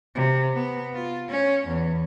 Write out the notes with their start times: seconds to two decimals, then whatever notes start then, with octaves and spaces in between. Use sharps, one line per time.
0.15 C3
0.53 B3
0.94 F4
1.29 C#4
1.67 E2